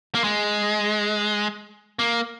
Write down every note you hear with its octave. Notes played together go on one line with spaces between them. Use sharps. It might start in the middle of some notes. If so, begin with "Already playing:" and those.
A#3
G#3
A#3